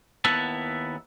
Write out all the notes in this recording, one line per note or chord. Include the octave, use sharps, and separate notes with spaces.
D#2 B3 E4 E5 F#5 A5